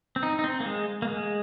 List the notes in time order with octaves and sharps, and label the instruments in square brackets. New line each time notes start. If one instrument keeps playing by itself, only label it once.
[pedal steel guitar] C4
D#4
D#4
C4
A#3
G#3
A#3
G#3